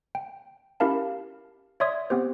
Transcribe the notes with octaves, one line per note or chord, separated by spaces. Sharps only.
G5
C#4 E4 G4 A#4 F5 A5
C#5 D5 E5 C6 D#6 G#6
B3 C4 G4 C5